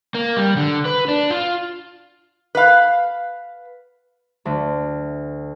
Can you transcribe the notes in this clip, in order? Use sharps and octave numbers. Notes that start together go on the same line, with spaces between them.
A#3
G3
D3
B4
D4
F4
B4 F5
D2